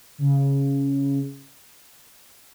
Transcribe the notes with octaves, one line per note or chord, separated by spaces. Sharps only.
C#3